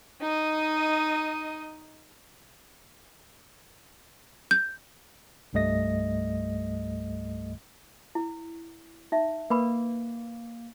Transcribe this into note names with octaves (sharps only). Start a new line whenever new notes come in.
D#4 D#5
G6
C2 G2 G3 A3 D#5 A#6
E4
D#4 E5
A#3 A#4 B4 B5